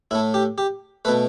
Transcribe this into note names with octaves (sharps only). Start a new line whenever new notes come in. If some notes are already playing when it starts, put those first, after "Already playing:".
A2 A3 E4
G4
G4
B2 A3 B4